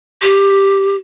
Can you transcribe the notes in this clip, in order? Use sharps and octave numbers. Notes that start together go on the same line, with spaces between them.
G4